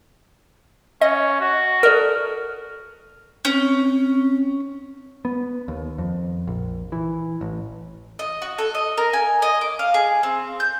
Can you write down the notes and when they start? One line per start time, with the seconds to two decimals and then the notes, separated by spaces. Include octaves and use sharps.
1.01 C#4 D#5
1.40 F#4
1.83 A4 A#4 D5 F6
3.45 C4 C#4
5.25 B3
5.68 D#2
5.98 F2
6.48 A#1
6.92 E3
7.41 A1
8.19 D#5
8.42 F#4
8.58 A4
8.75 D#5
8.98 A#4
9.13 G#5
9.42 D#5
9.61 D6
9.79 F5
9.94 G#4
10.23 C4
10.60 G6